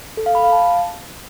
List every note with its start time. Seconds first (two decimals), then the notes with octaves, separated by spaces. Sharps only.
0.17 A4
0.26 F5
0.35 B5
0.44 F5
0.52 A5